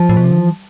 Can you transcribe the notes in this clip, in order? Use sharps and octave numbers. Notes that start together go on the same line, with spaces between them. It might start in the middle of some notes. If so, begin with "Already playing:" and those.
Already playing: F3
A2
B2
C3
D3
E3